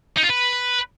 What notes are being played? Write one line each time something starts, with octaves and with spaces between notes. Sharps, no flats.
D#4
F4
B4